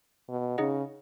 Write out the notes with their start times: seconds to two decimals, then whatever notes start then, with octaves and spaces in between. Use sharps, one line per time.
0.29 B2
0.58 C#3 D#4 G#4 D#5 F#5